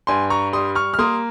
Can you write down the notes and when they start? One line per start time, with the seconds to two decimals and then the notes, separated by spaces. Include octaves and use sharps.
0.07 G2 G#5 C6
0.30 A#5 C#6
0.52 G3 C6 D#6
0.75 C#6 F6
0.94 F6
0.99 A#3 C6 D#6